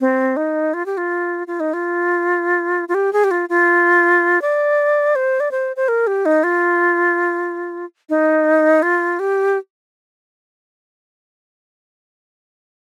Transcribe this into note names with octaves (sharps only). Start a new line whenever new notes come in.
C4
D#4
F4
G4
F4
F4
D#4
F4
F4
G4
G#4
G4
F4
F4
D5
C5
D5
C5
C5
A#4
G4
D#4
F4
D#4
F4
G4